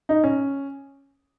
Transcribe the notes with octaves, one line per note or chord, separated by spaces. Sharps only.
D#4
C#4